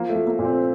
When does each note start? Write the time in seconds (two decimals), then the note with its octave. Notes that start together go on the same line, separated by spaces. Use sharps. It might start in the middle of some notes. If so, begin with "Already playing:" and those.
Already playing: F3 A#3
0.09 A3
0.15 F3
0.27 A#3
0.39 A#2
0.45 C4